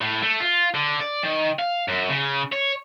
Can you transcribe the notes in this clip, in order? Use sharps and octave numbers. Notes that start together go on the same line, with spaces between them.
A2
A3
F4
D3
D5
D#3
F5
F#2
C#3
C#5